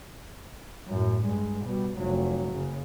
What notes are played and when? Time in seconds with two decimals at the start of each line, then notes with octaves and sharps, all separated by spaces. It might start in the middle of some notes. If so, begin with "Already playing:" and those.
0.88 F#2 A2
1.23 G2 G#3
1.64 B2 G3
1.98 F1 F#3
2.50 F#1 C#3